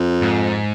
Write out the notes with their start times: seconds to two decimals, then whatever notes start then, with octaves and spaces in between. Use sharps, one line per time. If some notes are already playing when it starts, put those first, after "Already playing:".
Already playing: F2
0.22 G#2